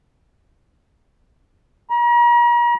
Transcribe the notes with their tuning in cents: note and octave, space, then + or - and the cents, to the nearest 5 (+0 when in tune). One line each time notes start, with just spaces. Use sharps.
A#5 +40